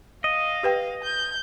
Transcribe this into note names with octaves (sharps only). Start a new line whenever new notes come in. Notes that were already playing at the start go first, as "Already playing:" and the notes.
D#5 F5
G4 B4 G5
G6